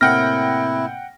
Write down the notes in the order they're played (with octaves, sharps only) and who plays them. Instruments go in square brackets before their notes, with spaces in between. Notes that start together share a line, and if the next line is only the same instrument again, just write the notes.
[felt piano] A2 C3 A#3 [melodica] E4 [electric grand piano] F#5 G5 A#6 [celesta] F6